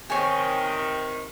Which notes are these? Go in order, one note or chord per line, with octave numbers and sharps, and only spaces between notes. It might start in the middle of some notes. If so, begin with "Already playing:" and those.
C3 D#3 C#5 G#5